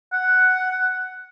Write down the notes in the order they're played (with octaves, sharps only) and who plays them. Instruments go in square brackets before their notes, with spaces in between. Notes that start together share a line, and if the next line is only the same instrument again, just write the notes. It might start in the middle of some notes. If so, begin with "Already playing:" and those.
[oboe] F#5